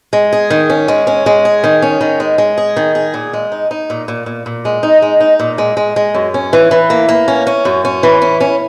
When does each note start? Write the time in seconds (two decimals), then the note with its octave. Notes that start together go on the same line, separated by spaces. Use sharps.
0.13 G#3
0.33 G#4
0.50 D#3
0.70 C#4
0.88 G#3
1.07 C#4
1.26 G#3
1.45 G#4
1.64 D#3
1.82 C#4
2.01 D#3
2.20 G#3
2.38 G#3
2.58 G#4
2.76 D#3
2.95 G#4
3.14 A#2
3.33 G#3
3.52 D#4
3.71 D#4
3.90 A#2
4.08 A#2
4.26 A#2
4.46 A#2
4.65 G#3
4.83 D#4
5.02 G#3
5.20 D#4
5.40 A#2
5.58 G#3
5.77 G#3
5.96 G#3
6.14 F#2
6.34 C#4
6.53 E3
6.71 E3
6.90 A#3
7.09 A#3
7.28 C#4
7.47 C#4
7.65 F#2
7.85 C#4
8.03 E3
8.22 C#4
8.40 C#4